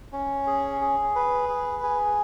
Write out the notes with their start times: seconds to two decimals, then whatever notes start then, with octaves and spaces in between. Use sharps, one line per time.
0.13 C#4
0.47 G#4
0.81 G#4
1.15 B4
1.49 G#4
1.83 G#4